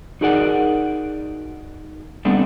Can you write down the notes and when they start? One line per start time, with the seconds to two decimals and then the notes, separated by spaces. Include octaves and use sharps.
0.21 D#4 F#4 G#4 A#4 D5 F#5
2.25 G3 A3 B3 C4 D4